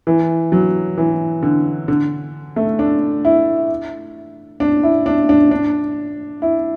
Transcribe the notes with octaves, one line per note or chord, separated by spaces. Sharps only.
E3
F#3
E3
D3
D3
A3
D4
E4
D4
E4
D4
D4
D4
E4